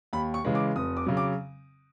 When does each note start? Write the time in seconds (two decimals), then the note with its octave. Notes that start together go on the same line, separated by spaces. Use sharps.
0.13 D#2 B5
0.34 C#6
0.45 C#3 E3 G#3
0.55 D6
0.76 F1 D#6
0.97 D6
1.06 C#3 F#3
1.17 D6